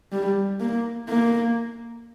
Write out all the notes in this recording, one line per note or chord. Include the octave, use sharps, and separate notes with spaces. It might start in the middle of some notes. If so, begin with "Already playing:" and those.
G3
A#3
A#3